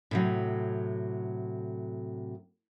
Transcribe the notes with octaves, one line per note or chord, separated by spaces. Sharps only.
A2 C3 F#3